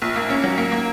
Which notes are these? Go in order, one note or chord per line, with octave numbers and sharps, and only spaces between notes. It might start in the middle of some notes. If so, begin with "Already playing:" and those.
A#1
A#3
C#4
F#3
A#3
A#3